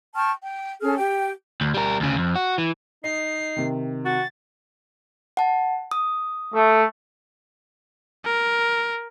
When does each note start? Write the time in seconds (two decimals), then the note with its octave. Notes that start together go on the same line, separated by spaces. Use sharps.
0.15 G5 A5 C#6 F6
0.41 G5
0.81 C#4 G#4 A4 F6
0.98 G4 G5
1.61 D2
1.74 G3 A#4
2.00 D2 C#3
2.18 F2
2.35 F#4
2.58 E3
3.04 D#4 D#5 C7
3.56 C3 D#3
4.05 F#4 A6
5.37 F#5 A5
5.91 D#6
6.53 A3
8.25 A#4